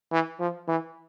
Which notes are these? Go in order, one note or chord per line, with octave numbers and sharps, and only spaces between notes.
E3
F3
E3